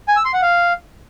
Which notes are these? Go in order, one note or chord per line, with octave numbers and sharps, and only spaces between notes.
G#5
E6
C6
F#5
F5